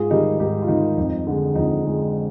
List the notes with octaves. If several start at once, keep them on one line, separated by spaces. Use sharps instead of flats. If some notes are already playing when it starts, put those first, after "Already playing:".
Already playing: G#2 F4 G#4
D#3 G3 D#4 G4
G#2 D#4 G4
F4
D#3 G3 D#4
F2
D3 G#3
F2 D#4
D3 G#3